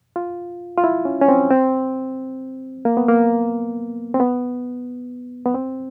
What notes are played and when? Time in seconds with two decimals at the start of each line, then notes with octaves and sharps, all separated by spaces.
0.16 F4
0.77 F4
0.84 E4
1.05 C#4
1.21 C#4
1.28 C4
1.51 C4
2.85 A#3
2.97 B3
3.08 A#3
4.14 C4
4.20 B3
5.46 B3
5.55 C4